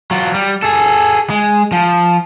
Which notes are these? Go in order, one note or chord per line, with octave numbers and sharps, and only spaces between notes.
F#3 F4
G3
G#4 A4
G#3
F3